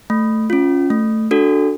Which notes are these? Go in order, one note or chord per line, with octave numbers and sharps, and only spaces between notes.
A3
C#4 F4
A3
D4 F#4 A4